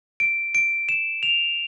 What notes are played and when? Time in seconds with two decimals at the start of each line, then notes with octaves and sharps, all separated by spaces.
0.20 D7
0.55 D7
0.89 E7
1.23 F7